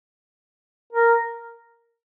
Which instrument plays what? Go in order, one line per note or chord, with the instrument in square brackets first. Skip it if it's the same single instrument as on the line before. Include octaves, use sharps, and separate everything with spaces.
[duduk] A#4